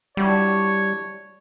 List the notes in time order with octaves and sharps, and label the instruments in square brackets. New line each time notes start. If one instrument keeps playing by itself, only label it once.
[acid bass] G3 [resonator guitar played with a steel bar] D4 E4 F#4 [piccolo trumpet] C#5